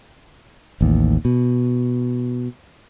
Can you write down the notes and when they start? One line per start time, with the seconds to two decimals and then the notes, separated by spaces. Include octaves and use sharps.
0.81 A1 D#2
1.25 B2